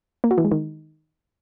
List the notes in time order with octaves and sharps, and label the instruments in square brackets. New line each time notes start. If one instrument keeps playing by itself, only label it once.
[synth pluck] A#3
F#4
E3
G#3
D#3